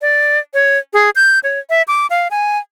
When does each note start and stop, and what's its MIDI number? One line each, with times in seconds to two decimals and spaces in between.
0.02 0.39 74
0.54 0.78 73
0.93 1.10 68
1.16 1.39 91
1.43 1.59 73
1.70 1.82 76
1.88 2.07 86
2.10 2.28 77
2.31 2.58 80